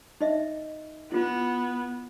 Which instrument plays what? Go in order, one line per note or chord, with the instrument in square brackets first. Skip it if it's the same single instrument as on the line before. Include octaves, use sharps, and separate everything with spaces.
[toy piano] D#4 D#5 E5
[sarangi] B3 [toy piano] E4 F4